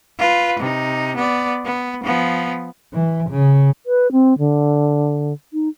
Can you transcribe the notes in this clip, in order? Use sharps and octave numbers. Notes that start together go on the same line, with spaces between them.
F4 B4
C3 D#4
B3 D5
B3
F3 B3
E3
C#3
B4
C4
D3
D#4